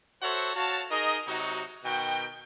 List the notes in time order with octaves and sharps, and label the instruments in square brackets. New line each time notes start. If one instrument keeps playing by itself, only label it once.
[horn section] F#4 A4 C5 C#5 E5 F#5
F#4 C#5 F5 A5
D#4 G#4 A#4 D#5
C3 F#3 D#4 F#4
B2 D#3 F#4 G5